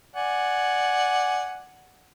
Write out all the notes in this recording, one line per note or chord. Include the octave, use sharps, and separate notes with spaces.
D5 F#5 G#5